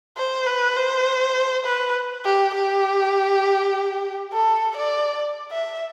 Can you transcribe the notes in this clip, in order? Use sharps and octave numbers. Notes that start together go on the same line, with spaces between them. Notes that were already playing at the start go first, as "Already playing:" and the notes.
C5
B4
C5
B4
G4
G4
A4
D5
E5